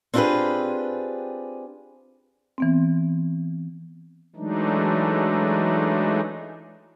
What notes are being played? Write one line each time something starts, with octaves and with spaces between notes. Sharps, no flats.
C4 D4 F4 G4 G#4 B4
E3 B3 C4
E3 F#3 G#3 A3 D4 D#4